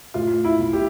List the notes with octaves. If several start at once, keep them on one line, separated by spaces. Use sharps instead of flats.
A2 F4
E4
B1
G4